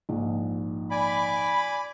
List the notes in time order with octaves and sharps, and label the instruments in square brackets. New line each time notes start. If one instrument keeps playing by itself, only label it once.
[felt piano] A#1 G#2
[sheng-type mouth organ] D5 G#5 D6 [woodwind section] B5